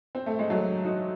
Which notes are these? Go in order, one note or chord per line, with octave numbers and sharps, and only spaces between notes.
C4
A3
G#3
F#3 A3
D#4 F#4